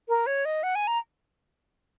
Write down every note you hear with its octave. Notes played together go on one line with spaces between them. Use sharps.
A#4
C#5
D#5
F#5
G#5
A#5